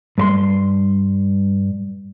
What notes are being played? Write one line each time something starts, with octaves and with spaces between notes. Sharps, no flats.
G2 B4 C6